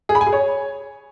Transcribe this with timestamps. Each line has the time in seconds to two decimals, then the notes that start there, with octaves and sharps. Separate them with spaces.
0.09 G#4
0.15 B5
0.21 G#5
0.27 G#4
0.33 C#5